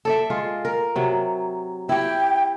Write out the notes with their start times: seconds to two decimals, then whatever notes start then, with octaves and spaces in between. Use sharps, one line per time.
0.05 A4 D5 E5
0.30 G#3 F4
0.65 A#4
0.96 C3 F#3
1.89 E4 G4 G5